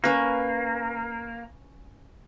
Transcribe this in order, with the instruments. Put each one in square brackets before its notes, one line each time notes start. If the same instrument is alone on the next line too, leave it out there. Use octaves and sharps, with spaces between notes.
[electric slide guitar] A#3 [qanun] C#4 B4